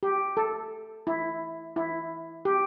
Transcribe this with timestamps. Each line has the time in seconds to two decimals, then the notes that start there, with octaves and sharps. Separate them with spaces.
0.03 G4
0.37 A4
1.07 E4
1.76 E4
2.45 G4